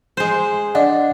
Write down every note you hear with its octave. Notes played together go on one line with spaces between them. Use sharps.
G#3 C5
D4 D5 D#5 F#5